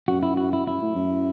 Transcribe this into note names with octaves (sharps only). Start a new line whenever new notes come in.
F#2 F#4
E4
F#4
E4
F#2 E4
A2
F#2